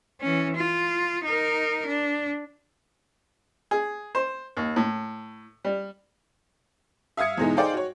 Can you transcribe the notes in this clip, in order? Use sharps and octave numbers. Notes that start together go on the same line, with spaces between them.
E3 C#4
F4
D#4 A#4
D4
G#4
C5
D#2
A2
G3
E5 F5 D#6 G#6 C#7
E2 G#2 B2 E3 G#3 D#4
D#4 G#4 C5 D5 F5 G5
F#4 C#5